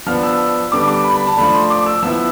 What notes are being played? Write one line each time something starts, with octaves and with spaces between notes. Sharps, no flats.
F3 B3 D4 F6
E6
D3 G3 B3 D4 D6
D6
B5
B5
A5
F3 A3 D4 B5
C6
D6
E6
F3 B3 E4 E6